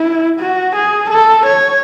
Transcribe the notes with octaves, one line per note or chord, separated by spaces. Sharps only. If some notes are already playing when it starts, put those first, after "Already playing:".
Already playing: E4
F#4
G#4
A4
C#5